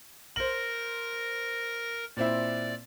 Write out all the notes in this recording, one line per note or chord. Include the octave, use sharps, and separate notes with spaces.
A#4 C5 A#6 F#7
A#2 C4 E4 D5